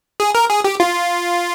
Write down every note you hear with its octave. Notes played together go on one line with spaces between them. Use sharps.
G#4
A#4
G#4
G4
F4